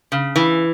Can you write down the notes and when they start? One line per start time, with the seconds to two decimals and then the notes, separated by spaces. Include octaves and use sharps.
0.12 C#3
0.36 E3